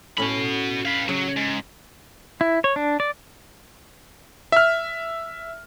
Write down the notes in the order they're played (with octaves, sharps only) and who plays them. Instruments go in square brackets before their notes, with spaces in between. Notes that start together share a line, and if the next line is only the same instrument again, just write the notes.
[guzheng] A2 C#4 [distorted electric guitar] F#4 B5
[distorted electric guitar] B4 F5
[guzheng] C#3 [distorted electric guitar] F#3
[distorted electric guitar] G#2
[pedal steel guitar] E4
C#5
D4
D5
[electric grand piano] E5 F6